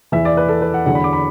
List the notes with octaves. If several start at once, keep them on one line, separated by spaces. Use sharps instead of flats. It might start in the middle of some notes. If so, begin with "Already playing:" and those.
E2 E3 E5
D5
B4
A4
B4
F#5
E2 D3 F#3 F#5
B5
D6
B5